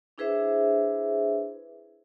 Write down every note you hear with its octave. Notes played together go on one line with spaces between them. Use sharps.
D4 E4 G#4 B4 C5 E5